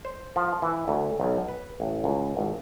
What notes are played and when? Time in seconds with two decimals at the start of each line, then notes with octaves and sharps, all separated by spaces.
0.05 C5
0.36 F3
0.62 E3
0.88 D2
1.20 B1
1.48 B4
1.80 A1
2.04 C#2
2.37 G#1